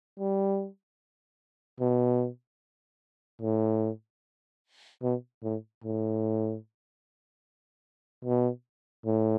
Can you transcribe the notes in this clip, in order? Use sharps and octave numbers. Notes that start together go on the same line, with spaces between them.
G3
B2
A2
B2
A2
A2
B2
A2